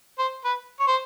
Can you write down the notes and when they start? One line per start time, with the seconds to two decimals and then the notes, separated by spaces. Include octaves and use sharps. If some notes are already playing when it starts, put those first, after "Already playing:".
0.19 C5
0.45 B4
0.80 C#5
0.87 C5